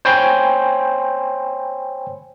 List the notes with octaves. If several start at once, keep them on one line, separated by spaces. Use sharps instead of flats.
C5 C#5 G5 G#5 B5 C6